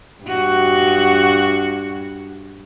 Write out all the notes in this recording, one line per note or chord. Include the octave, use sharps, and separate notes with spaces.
G2 F#4